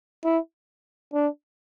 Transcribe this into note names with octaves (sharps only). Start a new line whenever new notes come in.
E4
D4